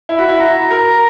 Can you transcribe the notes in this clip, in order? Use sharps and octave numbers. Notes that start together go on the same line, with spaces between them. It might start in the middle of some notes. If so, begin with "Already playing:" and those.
E4
F#4 B5
E4
F#4 A#5
A#4